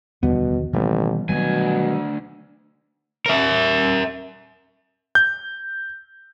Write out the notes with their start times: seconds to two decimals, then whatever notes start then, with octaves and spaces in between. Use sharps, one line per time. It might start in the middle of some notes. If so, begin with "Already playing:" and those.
0.23 F1 D#2 B2 D3 F3 G3 B3
0.73 A1 B2 D#3 E3 G3 A#3 B3
1.29 D2 B2 D#3 F#3 G3 A3 G#5
3.26 A#4 E5
5.15 G6